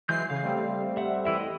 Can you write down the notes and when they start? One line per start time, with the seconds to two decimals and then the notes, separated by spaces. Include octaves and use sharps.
0.09 E3 F#3 G#3 G6 C7
0.30 C#3 G#4 F5
0.43 G3 A3 C4
0.97 E5 F#5
1.25 E3 E4 E5
1.40 D#5